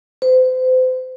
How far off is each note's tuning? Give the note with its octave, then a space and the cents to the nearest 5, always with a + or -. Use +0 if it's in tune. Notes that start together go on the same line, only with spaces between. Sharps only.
C5 -35